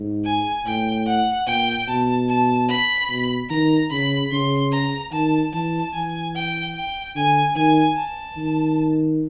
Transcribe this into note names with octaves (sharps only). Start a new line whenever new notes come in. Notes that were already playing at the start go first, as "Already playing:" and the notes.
Already playing: G#2
G#5
A2 G5
F#5
A#2 G5
B2 A5
A5
B5
B2
D#3 A#5
C#3 B5
C#3 C6
A#5
D#3 A5
E3 A5
E3 G#5
G5
G5
D3 G#5
D#3 G#5
A5
D#3